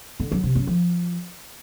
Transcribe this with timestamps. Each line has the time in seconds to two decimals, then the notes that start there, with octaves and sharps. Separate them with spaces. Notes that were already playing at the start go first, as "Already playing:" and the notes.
0.20 D3
0.32 F#3
0.44 C3
0.55 F#2
0.67 F3